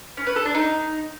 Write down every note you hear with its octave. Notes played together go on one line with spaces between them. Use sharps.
C#4
B4
A4
D4
D#4